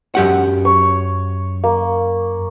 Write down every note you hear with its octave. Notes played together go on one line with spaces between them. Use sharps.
F#2 G4 F#5
C#5
A#3